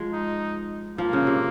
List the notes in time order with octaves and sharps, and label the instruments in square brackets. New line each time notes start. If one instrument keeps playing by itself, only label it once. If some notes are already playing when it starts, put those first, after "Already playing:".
Already playing: [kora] F3 G#3
[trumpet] D#4
[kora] F3 [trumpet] A#3
[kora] C#3
C3